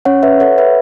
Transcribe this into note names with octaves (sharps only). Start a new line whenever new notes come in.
C#4 C#5 F#5
B4 E5
A4 C#5 F#5
B4 E5